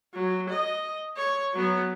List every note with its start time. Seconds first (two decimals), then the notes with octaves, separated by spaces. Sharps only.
0.14 F#3
0.49 D#5
1.17 C#5
1.54 F#3 B3